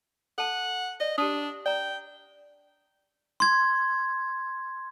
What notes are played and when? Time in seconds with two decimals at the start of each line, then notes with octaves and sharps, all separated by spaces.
0.38 A4 F#5 A5
1.00 D5 D#5
1.18 D4 G4 A5 D#6
1.66 D5 G5 A#5
3.40 C6 G#6